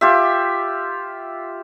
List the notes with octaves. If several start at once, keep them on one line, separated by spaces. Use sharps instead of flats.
F4 G4 E5